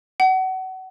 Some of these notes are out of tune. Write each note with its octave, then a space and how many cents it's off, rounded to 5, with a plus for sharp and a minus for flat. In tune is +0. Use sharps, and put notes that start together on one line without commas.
F#5 +30